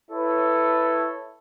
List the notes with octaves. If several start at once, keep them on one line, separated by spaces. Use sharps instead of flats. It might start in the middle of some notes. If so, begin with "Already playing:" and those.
E4 A4 B4 C#5